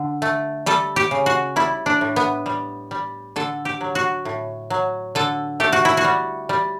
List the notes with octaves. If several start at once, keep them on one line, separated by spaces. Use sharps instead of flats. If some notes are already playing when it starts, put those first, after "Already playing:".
Already playing: D3
A3
G3 A4
G4
C#3
F#4
G3 E4
D4
A2
B3
G3
G3
D3 A4
G4
F#3
F#4
A2
F#3
D3 A4
A3 G4
F#4
E4
F#4
G3
G3